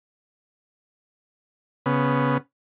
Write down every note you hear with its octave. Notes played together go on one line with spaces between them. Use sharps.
C#3 B3